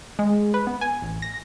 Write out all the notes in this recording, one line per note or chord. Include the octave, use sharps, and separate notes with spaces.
G#3
B4
B3
G#5
A1
A#6